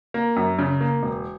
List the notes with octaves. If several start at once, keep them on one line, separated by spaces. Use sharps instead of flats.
A#3
F#2
C#3
A#3
E1